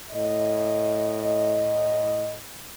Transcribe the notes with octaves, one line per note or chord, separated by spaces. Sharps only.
A2 D#5